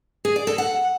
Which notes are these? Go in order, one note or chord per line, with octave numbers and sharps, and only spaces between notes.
G#4
D5
A4
F#5